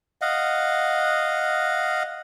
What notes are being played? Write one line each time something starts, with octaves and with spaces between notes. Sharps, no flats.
D#5 F5 F#5